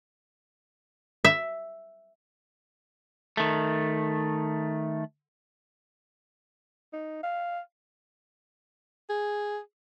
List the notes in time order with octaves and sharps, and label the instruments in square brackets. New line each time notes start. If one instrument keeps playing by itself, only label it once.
[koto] E5
[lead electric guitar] D#3 A3
[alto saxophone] D#4
F5
[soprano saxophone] G#4